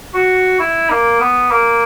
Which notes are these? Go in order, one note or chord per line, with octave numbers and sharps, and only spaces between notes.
F#4
E4
A#3
B3
A#3